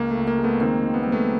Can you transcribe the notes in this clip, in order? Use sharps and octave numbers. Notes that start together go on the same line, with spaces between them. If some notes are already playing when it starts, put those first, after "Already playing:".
Already playing: C#2 A#3
A3
C#2
A#3
G#3
A3 B3
D#3 A#3 C4
D#3
B3
G3 C4
A3 B3